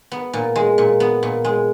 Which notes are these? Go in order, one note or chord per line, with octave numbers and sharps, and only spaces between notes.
B3
A#2
G#3
A#2
B3
A#2
G#3